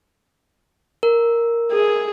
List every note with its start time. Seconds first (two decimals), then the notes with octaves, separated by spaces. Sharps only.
1.03 A#4
1.72 G#4